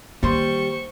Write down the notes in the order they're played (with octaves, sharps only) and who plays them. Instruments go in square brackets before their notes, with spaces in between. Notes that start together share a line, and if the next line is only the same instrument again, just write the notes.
[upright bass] D#3 E3 [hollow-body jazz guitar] G3 C6 [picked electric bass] A#3 [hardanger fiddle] C5 C#6